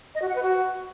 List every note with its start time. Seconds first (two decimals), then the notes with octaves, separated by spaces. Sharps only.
0.15 D#5
0.22 F#4
0.29 F#5
0.36 B4
0.42 F#4